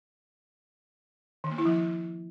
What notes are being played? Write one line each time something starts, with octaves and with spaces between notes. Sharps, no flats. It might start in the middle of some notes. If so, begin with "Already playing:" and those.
D#3
A#3
E4
F3